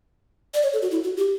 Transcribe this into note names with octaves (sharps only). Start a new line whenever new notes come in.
D5
C#5
A4
F#4
E4
F#4
G4